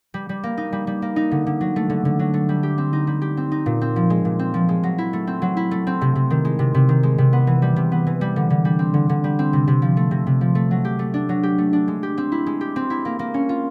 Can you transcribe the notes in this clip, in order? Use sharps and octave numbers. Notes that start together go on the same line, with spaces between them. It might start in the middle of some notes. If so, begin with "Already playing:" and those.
G3
G3
A#3
D#4
G3
G3
A#3
D#4
D3
D3
F#3
A3
D3
D3
F#3
A3
G3
G4
C4
D#4
G3
G4
C4
D#4
A#2
C4
F3
G#3
A#2
C4
F3
G#3
F#3
E4
A3
C4
F#3
E4
A3
C4
C3
C3
D#3
G#3
C3
C3
D#3
G#3
C3
B3
E3
G3
C3
B3
E3
G3
D3
D3
G3
C4
D3
D3
G3
C4
C3
C3
F3
A3
C3
C3
F3
A3
F#3
G4
A3
D4
F#3
G4
A3
D4
G#3
G4
C4
E4
G#3
G4
C4
E4
A#3
A#3
C#4
F4